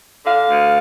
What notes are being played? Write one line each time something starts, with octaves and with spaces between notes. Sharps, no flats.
D3 F5
D2